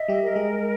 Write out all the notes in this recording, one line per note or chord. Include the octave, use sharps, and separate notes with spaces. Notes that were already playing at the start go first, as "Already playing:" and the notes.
Already playing: D#5 E5
G3 G4
A#4
G#3 G#4